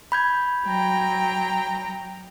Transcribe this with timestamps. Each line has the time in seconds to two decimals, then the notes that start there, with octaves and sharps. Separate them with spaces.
0.12 B5 G6 G#6
0.67 F#3 G5 A#5